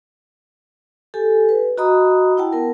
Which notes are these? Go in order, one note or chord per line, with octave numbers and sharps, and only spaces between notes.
G4 A4 G#5
B4
F#4 D#5 A#5 B5 D#6
E4 F#5 G5 A5
B3 A#4